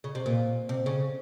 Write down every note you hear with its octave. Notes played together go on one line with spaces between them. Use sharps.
C#3
C3
A#2
C3
C#3